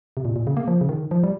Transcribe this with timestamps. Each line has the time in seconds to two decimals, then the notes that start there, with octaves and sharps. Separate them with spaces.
0.17 C3
0.25 A#2
0.36 A#2
0.47 C#3
0.57 A#3
0.68 F3
0.81 C#3
0.89 D#3
1.11 F3
1.23 G3